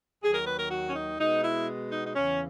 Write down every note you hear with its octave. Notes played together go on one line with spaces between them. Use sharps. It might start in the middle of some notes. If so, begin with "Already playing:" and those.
D#2 D#3 F#3 G#4
A#4
B4
A#4
F#4
C#4
D#4
B2 G#3 B3 D#4
E4
D#4
D#4
E2 C#3 E3 C#4